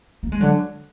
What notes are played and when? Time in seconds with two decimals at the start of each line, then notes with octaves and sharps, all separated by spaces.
0.23 A#3
0.32 G#3
0.40 D3 F#3